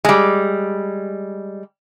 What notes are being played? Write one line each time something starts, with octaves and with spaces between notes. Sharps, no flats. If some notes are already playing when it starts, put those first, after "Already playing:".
G3 G#3